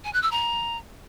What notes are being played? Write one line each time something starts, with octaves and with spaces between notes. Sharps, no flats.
G#5
F#6
E6
A#5